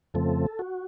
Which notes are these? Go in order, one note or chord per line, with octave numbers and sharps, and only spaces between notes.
F2 C#3 F3 A3 C4 A4
F#4